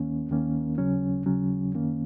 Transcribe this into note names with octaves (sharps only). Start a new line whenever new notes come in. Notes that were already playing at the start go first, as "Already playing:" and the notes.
Already playing: D#2 D#3 A#3 C#4
D#2 D#3 A#3 C#4
D#2 C#3 F#3 C#4
D#2 C#3 F#3 C#4
F#2 D#3 A#3 C#4